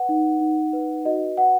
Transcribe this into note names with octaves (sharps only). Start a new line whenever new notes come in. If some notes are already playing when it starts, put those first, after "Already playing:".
Already playing: B4 F#5
D#4
D#4
B4
F#4 D#5
B4 F#5